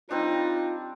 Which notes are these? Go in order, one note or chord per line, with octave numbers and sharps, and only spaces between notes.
G3 C4 D4 D#4 F4